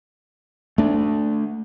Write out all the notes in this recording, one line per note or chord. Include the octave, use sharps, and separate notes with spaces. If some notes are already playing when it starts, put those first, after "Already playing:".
A3 D4